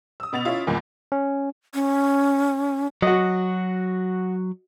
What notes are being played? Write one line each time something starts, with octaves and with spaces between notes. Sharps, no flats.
D#6 E6
B2 B3 A6 F7
C#4 E4 F4
E2 G2 A#2 D#3
C#4
C#4
F#3 F#4 D#5